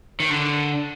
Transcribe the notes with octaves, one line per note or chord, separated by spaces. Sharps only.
D#3
D3